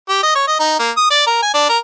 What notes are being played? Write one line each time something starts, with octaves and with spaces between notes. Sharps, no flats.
G4
D#5
C#5
D#5
D#4
A#3
D#6
D5
A#4
G#5
D4
A#4